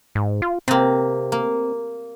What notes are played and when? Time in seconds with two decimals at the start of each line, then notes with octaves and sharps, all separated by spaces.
0.15 G#2
0.42 F4
0.68 C3 A#3 C4
1.32 A#3